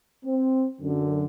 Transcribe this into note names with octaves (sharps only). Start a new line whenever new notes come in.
C4
F#2 D3